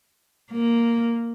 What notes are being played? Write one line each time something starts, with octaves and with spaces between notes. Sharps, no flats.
A#3